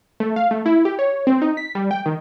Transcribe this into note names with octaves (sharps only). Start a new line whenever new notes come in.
A3
F5
A3
E4
G4
C#5
C4
D#4
B6
G3
G5
D#3